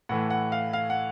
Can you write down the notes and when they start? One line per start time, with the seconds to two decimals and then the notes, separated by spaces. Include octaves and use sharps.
0.09 A2 E3 A3 F#5
0.30 F#5
0.52 F5
0.73 F5
0.90 F#5